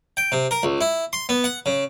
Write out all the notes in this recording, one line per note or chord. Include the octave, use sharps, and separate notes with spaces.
G5
C3
A#4
C#2
E4
C6
B3
F#5
C#3